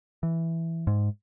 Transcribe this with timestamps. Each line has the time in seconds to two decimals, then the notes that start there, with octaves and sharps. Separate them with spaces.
0.23 E3
0.87 G#2